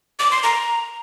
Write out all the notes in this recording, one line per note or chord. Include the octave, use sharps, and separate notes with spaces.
D6
C6
A#5